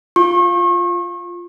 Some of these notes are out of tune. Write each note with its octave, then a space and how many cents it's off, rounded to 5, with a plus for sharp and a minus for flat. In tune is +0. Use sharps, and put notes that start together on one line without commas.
F4 +0 C#6 -35